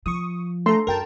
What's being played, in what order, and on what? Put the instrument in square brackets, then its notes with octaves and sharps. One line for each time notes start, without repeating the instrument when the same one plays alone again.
[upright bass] F3 [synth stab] C#6 D#6
[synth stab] A3 A#5 [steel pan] A4 C6
[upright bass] F#2 [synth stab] A#4 G5 A5